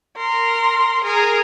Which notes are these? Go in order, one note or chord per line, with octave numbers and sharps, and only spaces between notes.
A#4 C6
G#4 A#4